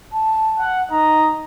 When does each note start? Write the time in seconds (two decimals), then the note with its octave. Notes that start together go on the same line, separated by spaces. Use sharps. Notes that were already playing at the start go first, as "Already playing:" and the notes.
0.13 A5
0.58 F#5
0.90 D#4 D#5 A#5